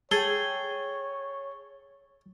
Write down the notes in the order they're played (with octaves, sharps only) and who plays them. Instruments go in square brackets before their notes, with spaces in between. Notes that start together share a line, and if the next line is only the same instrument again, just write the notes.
[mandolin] G#4 G5 [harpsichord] A4 [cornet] C#5 [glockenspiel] G7